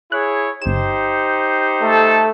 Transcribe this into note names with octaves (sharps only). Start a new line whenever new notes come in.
E4 G#4 C#5 F#6
G1 D#4 G4 C5 E7
A3 A4